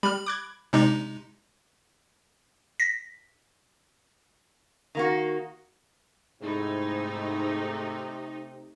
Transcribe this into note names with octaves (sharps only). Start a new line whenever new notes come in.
G3 B5 F6
D6 F#6 G#6
C3 G#3 C4 D4 D#4
A#6 B6
D#3 A#3 F#4
G#2 C3 A3 D#4 E4